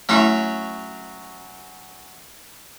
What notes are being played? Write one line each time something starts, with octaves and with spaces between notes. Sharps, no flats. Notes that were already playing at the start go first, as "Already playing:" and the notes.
F#3 A3 C#4 E4 E5